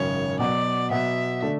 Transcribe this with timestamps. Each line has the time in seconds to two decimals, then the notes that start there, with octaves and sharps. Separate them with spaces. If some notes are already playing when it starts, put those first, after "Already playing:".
Already playing: G#1 F#2 C#3 C#5
0.38 B2 F#3 B3 F#4 D5
0.90 B2 F#3 B3 F#4 E5
1.42 D3 A3 D4